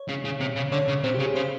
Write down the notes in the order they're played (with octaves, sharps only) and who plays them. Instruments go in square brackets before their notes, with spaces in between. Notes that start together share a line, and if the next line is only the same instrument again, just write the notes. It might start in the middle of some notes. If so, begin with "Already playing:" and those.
Already playing: [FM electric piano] C#5
[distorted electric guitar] C#3
C#3
C3
C#3
[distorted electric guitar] D3 [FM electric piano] C#5
[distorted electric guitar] C#3
[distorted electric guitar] C3 [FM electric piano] C5
[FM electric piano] G4
[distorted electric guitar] C#3
[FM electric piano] G#4
[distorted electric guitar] C#3 [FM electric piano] C5